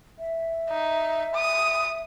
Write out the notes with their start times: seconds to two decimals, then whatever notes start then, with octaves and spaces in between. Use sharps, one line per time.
0.19 E5
0.70 D#4
1.34 D#6